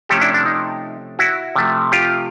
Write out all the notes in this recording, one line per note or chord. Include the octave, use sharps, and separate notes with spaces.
C3 F3 A3 C#4 G4 A4
D4 E4
D4
D#4
E4 F#4
C3 F3 A3
F4 G4